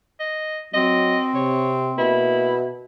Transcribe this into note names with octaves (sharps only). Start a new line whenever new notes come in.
D#5
F#3 C4 D#5
C3 C#5
B2 A#3 E4